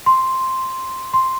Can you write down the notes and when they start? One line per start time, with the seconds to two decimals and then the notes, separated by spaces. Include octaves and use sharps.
0.06 C6
1.14 C6